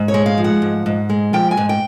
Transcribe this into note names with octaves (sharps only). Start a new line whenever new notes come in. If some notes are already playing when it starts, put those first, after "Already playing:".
Already playing: G#2
C#5
G#3
F5
F3
F#5
G#2
G#2
G#3
F3 G5
G#5
G#2
G5